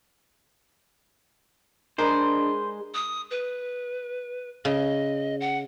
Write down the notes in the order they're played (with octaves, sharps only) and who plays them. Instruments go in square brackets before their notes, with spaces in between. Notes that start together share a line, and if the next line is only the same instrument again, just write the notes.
[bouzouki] G#3 G#4 [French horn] D4 [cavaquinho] A#4 B5 D6 [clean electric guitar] C5
[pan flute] D#6
B4
[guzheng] C#3 [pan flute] D#5
[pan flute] F#5